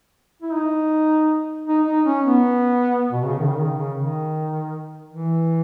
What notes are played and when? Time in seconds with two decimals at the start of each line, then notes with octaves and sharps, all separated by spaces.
0.42 E4
0.53 D#4
1.68 D#4
1.86 D#4
2.06 C#4
2.25 B3
3.12 B2
3.25 C#3
3.39 D#3
3.49 C#3
3.58 D#3
3.77 C#3
3.96 D#3
5.10 E3